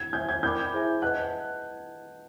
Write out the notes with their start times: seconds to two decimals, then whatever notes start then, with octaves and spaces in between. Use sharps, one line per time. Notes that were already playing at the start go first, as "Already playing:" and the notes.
Already playing: G#6
0.13 C5 E5 G#5 G6
0.29 G#6
0.42 A#4 D5 G5 B5 D6 G6
0.72 E4 G#4 C5 E5 G#5
1.02 B4 D#5 F#5 A5 F#6